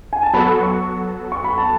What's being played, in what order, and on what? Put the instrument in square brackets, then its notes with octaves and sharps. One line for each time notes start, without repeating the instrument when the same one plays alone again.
[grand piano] G#5
A5
[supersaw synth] F#3 B3 F#4 A4 [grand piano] B5
[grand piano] C#6
C#6
B5
A5